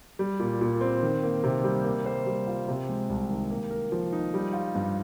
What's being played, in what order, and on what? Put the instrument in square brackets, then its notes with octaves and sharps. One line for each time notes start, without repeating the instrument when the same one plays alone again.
[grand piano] G3
A#2
A#2
C4
D#3
A#3
C3
G3
A#3
C5
G3
F4
C3
G#3
C2
D#3
A#3
A#4
F3
D#4
G3
F4
G2